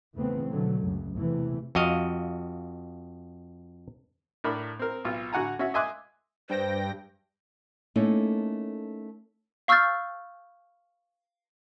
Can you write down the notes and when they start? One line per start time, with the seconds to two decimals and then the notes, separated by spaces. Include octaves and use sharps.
0.16 E2 C#3 A3 B3 C4
0.49 B2 D3 F#3 A3
0.81 C#2 F#2
1.16 E2 C3 E3 A3
1.75 F2 F#4 D#5 F5
4.44 A2 D4 A#4 B5
4.79 C4 A#4
5.05 B1 F4
5.33 D3 F#4 F#5 G#5 A#5
5.59 C#4 F#4 E5
5.74 D#5 E5 G#5 C6 D6 F#6
6.49 G2 C5 G5 A#6
7.96 A3 A#3 C#4 D#4 E4 A4
9.68 F5 C#6 E6 F6 G6 A6